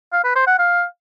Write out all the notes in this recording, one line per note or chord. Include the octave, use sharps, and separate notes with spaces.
F5
B4
C5
F#5
F5